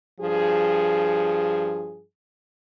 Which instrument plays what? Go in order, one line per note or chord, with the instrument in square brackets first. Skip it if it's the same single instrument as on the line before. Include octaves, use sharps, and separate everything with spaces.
[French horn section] G2 F3 G#4